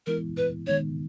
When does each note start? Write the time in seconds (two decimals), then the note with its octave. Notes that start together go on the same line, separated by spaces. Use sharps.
0.07 E3 G#3 B3 E4 A#4
0.37 B4
0.67 D#3 G#3 B3 D#4 C#5